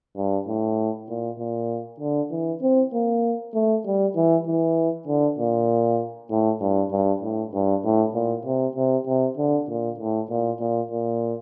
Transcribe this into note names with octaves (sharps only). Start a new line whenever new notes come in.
G2
A2
A#2
A#2
D3
E3
C4
A#3
A3
G3
E3
E3
D3
A#2
A2
G2
G2
A2
G2
A2
A#2
C3
C3
C3
D3
A#2
A2
A#2
A#2
A#2